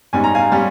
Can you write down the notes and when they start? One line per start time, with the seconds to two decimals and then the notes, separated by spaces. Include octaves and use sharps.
0.13 G#2 G3 C#4 G#5
0.24 A#5
0.35 F5 G#5
0.52 G3 C#4